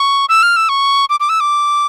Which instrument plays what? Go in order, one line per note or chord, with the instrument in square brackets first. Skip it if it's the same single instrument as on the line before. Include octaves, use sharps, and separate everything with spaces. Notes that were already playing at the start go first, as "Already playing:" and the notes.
Already playing: [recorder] C#6
E6
F6
E6
C#6
D6
D6
E6
D6